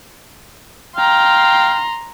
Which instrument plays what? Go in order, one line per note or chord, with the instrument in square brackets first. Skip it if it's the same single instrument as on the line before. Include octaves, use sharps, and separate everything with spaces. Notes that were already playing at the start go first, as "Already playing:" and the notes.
[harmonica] F5 G5 [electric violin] A#5 C6